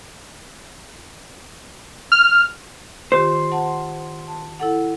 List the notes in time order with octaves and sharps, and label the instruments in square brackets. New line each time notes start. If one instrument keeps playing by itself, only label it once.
[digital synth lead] F6
[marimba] D#3 F4 G4 [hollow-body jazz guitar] C5
[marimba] F#5 A5 C6
A5
E4 A4 F#5